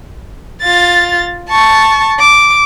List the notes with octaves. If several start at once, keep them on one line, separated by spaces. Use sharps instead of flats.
F4 A6
A5 C#6
D6